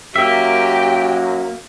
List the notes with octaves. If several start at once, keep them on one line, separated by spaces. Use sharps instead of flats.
F#2 A#3 G4 E5 G5